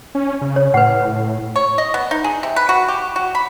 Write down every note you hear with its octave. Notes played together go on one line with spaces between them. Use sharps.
C#4
C#3
C#5
A2 B4 F#5
C#5
D#5
B3
D#4
G#4
C3
B4
F#4
G4
F#4
B5